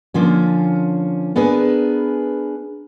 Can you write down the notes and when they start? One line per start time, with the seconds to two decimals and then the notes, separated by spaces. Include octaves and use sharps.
0.14 D3 F3 A#3 C#4
1.36 B3 D4 G#4 A#4 B4